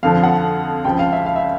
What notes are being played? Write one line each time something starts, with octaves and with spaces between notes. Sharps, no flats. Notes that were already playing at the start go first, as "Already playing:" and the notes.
F2 D3 F3 F5
F#5
C#2 C#3 F3 G5
F5
E5
F5
E5